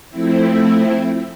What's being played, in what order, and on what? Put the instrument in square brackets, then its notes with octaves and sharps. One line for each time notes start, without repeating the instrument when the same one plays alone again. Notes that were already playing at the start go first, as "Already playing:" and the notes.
[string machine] F3 A3 C4 E4